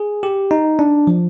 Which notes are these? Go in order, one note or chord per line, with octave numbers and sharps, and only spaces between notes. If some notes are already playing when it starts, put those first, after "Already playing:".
Already playing: G#4
G4
D#4
D4
F3